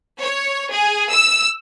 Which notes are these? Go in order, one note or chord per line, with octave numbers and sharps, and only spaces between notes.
C#5
G#4
E6